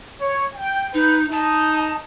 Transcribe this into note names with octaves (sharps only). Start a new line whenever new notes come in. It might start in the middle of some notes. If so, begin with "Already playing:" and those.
C#5
G5
D#4 B4
D#4 A5